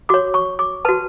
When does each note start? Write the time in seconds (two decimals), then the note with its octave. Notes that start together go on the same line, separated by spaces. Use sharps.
0.09 F#4 C#5 D6
0.34 C#6
0.59 D6
0.85 F#4 B4 A5